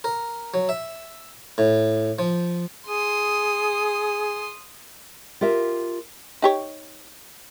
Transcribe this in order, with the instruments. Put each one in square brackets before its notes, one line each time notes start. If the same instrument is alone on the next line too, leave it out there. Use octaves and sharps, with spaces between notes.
[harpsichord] A#4
F#3
E5
A2
F3
[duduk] G#4 [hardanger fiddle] C6 D#6
[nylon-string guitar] F4 G4 A#4 E5
[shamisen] D#4 G4 C#5